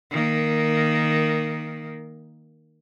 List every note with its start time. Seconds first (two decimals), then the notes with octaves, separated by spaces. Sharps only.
0.11 D#3 A#3